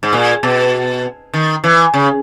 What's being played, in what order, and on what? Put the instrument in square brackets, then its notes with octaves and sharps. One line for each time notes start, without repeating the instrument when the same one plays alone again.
[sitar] G#2
A#2
B2
D#3
E3
C#3